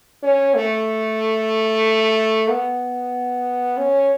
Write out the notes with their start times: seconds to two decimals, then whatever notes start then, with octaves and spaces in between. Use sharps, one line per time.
0.23 C#4
0.55 A3
2.49 B3
3.77 C#4